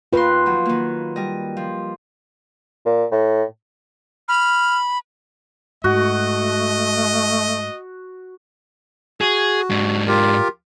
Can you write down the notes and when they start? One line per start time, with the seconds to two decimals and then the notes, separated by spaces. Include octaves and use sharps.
0.13 D#2 D#3 F4 B4 C6
0.46 F3 F#3
0.66 D#3 A#3
1.16 G3 D#5
1.57 F3
2.86 A#2
3.12 A2
4.28 B5 F6
5.84 G#2 A3 F#4 D#5
9.21 F#4 G#4
9.70 G#2 D4
10.07 F4 G4 A#4